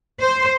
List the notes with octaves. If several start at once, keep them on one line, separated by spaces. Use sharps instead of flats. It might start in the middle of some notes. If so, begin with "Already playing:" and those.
C5